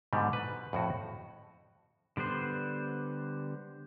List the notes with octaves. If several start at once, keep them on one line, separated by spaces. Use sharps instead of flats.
G#2 B2 D3 G3
B4
F2 A2 F#4
D3 G3 B3 C5